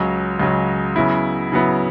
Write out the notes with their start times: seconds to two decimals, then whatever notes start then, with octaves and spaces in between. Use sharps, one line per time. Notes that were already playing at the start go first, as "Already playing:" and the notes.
Already playing: C#2 C#3 F#3
0.39 C#2 C#3 F#3
0.96 C#3 F#3 B3 E4
1.52 C#3 F#3 B3 E4